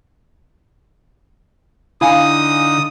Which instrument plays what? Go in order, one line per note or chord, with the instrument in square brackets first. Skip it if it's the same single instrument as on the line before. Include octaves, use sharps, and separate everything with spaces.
[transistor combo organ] D3 D#4 [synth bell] E4 F5 G#5 [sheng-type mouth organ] D#6